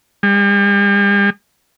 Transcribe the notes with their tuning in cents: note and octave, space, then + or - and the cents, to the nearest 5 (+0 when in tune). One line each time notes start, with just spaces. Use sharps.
G3 +45